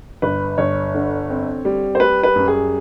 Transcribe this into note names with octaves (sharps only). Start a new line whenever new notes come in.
G1 B4
G1 C#5
D3
C4
G3
C5
G3 B4
B4
F#2
G#4